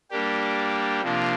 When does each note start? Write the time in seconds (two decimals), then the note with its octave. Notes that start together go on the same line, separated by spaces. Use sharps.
0.11 G3 A#3 D4 G4
1.02 C3 F3 A#3 D4 F4